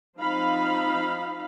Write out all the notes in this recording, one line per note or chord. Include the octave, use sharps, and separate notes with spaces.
F3 C4 D#4 F5 B5